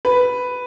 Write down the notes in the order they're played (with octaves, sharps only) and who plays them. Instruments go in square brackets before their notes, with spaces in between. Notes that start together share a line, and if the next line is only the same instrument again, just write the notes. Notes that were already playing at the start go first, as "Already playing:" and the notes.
[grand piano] B4